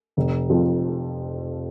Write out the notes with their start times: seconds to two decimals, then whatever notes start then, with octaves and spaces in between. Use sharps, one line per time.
0.17 F1
0.50 F2 F3